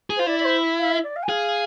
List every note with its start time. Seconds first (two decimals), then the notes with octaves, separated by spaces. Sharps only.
0.10 G#4
0.16 F4 C5
0.27 E4 D5
0.39 D5
0.44 C5
0.78 F5
0.90 E5
1.03 D5
1.15 F5
1.22 G#5
1.28 G#4 F5